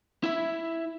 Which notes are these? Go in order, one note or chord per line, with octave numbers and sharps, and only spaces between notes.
E4 E5